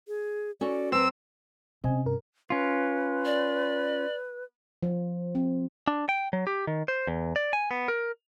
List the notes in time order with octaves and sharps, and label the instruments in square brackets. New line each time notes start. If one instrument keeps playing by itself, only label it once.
[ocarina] G#4
[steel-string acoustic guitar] C#4 F#4 A4 [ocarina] D5
[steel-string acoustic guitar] F#2 G5 A#5 [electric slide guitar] C4 [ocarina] B4 [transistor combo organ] E6
[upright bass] C3 C#4 [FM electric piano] C4 D#5 G#5
[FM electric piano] G2 A#4
[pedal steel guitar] C#4 F4 [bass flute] B4
[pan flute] D5
[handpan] F3
C4
[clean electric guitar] D4
G5
F#3
G4
D#3
C5
E2
D5
G#5
B3
A#4